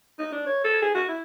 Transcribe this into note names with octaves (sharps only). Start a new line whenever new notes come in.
D#4
D4
C#5
A4
G#4
F#4
E4